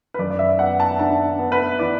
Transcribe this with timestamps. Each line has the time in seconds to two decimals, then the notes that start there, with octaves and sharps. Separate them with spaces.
0.14 B4
0.19 F#2 D5
0.31 D5
0.39 E5
0.59 B3 F#5
0.80 A5
0.99 D4 A5
1.39 B3
1.52 B4
1.79 E3 D5